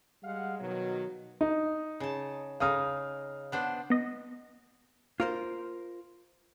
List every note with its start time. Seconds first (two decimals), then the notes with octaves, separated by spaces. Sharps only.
0.23 G3 G#3 F5 F#5
0.60 B2 D#3 F#3
1.41 D#4
2.00 C#3 A5
2.60 C#3 D#4 F5 D#6 F6
3.52 B3 D4 C5
3.90 B3 D#5
5.20 A#3 F4 A#4 C5